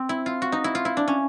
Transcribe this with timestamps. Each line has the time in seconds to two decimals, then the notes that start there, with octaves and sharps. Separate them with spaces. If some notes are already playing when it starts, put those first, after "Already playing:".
Already playing: C4
0.09 E4
0.26 F4
0.42 F#4
0.52 D#4
0.64 E4
0.75 F4
0.85 E4
0.97 D4
1.08 C#4